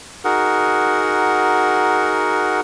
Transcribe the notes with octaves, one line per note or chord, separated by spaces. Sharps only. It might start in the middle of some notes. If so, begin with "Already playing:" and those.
D#4 F#4 G#4 A#4 F#5